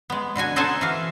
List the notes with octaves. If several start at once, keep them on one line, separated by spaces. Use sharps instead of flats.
G#3 B3
B2 D3 F#4 G#5
D#4 A4 C5 F#5 G#5 A5
E3 F#4 F5